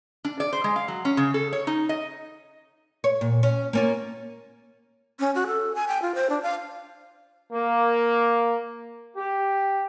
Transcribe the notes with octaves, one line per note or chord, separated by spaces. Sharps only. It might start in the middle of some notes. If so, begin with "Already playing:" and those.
D4
D5
C5
G#3
F5
F#3
C#4
C#3
A4
C#5
D#4
D#5
C#5
A#2
C#4
A#3 C#4 F4
C#4
F#4
A4
G#5
G5
F4
C5
D4
F5
A#3
G4